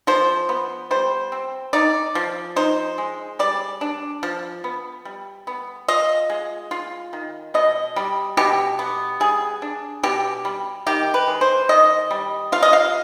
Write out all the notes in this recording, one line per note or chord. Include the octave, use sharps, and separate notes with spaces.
F3 C5
B3
G3 C5
C4
D#4 D5
F3
D#4 C5
G#3
G3 D5
D4
F3
B3
G3
B3
F4 D#5
G#3
F4
D#3
B2 D#5
G3
B2 G4
B3
G3 G#4
D4
B2 G4
G3
D#3 G4
B4
G#3
C5
D#3 D#5
G3
F4 F5
D#5
F5